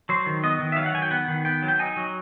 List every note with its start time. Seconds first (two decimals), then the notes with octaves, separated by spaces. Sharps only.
0.09 F#3 C5
0.27 D#3
0.44 B3 D#5
0.59 D#3
0.72 E5
0.76 F#3 F5
0.86 F#5
0.94 D#3 G#5
1.02 G5
1.11 B3 F#5
1.28 D#3
1.45 B3 G5
1.62 F#3
1.68 G5
1.79 D#4 G#5
1.97 F#3